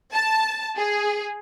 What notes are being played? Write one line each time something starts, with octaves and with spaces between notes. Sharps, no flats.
A5
G#4